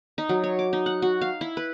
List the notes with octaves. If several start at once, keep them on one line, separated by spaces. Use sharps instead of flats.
D#4
F#3
C#5
D6
D#4
F#5
F#4
F5
E4
B4